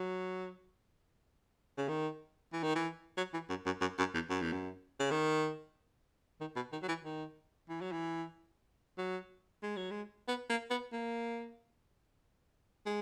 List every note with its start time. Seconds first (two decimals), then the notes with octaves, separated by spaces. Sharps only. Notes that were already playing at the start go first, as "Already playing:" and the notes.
Already playing: F#3
1.78 C#3
1.88 D#3
2.53 E3
2.63 D#3
2.75 E3
3.17 F#3
3.34 E3
3.50 F#2
3.66 F#2
3.81 F#2
3.98 F#2
4.14 E2
4.30 F#2
4.42 E2
4.52 F#2
5.00 C#3
5.11 D#3
6.41 D#3
6.56 B2
6.72 D#3
6.82 F#3
6.89 E3
7.05 D#3
7.69 E3
7.81 F#3
7.92 E3
8.98 F#3
9.63 G#3
9.76 F#3
9.91 G#3
10.28 B3
10.50 A#3
10.70 B3
10.93 A#3
12.86 G#3